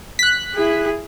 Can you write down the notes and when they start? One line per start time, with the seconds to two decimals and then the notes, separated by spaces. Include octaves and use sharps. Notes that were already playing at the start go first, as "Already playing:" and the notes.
0.19 F#6 B6
0.54 E4 G#4